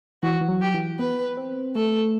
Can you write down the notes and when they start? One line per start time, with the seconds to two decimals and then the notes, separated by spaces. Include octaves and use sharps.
0.23 E3 F#4
0.41 E3
0.48 F#3
0.61 G4
0.74 E3
0.99 B3 B4
1.37 C4
1.75 A3 A4